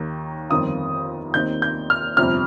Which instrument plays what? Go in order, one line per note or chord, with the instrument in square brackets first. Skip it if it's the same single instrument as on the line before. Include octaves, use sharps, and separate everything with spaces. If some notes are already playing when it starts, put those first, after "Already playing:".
Already playing: [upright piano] D#2 D#3 A#3
G1 F2 D#3 C4 F4 D#6
D#2 D#3 C4 D#4 G6
G6
F6
G1 F2 C3 F6